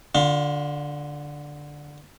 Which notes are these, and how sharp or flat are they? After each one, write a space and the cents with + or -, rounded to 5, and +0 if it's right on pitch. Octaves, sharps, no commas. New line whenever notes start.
D3 +0 F4 +25